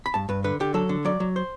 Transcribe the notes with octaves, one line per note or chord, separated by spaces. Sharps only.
B5
G2 A5
G2 B4
D3 B4
D3 G4
F#3 A4
D3
F#3 D5
F#3
C5